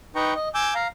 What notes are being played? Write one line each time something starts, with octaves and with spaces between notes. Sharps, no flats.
D#4 B4 G5 A#5 C#6
D#5
G#5 D6 E6 G6
F5 A#5